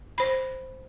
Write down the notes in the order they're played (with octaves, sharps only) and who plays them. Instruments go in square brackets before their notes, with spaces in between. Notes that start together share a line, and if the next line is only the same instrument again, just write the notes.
[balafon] C5 B5